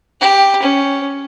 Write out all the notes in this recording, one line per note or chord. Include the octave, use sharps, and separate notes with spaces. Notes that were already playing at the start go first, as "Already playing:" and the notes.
G4
C#4